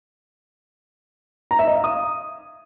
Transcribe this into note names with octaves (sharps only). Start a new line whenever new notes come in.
A#5
E5
D#5
F5
D#6